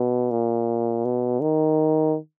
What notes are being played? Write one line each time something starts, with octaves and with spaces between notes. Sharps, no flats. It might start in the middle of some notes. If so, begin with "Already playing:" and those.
Already playing: B2
A#2
B2
D#3